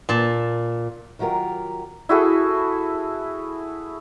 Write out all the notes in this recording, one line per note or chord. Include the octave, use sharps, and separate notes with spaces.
A#2 A5
D#3 F#3 F4 G4 A#4
E4 F#4 G#4 A4